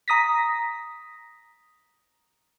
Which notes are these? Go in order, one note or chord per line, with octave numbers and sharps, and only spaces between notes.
A#5 D#6 A#6 B6